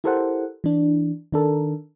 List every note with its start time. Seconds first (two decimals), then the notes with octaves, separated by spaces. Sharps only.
0.04 E4 G4 A4 A#4 C5 F#5
0.64 E3 D4
1.32 D#3 D4 A4 A#4